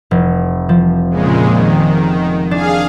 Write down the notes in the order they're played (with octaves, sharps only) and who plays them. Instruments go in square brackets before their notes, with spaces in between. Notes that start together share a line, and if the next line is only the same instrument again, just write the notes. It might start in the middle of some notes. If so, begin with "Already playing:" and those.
[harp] F1
F3
[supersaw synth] A#2 C#3 G#3
D#3
[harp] D4 [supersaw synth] G#4 F5